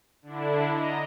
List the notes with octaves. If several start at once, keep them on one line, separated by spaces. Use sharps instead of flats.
D3 D4 E4
D#5 A#5